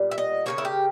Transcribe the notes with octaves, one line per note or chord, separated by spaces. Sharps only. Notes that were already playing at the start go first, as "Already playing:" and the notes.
Already playing: A#2 G3 B3
E5
D#5
C#3 G3 A#3 C#5
E4
G4